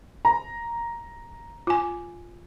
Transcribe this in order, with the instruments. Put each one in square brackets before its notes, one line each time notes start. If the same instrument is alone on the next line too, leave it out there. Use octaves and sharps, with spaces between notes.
[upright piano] A#5
[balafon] F4 G#5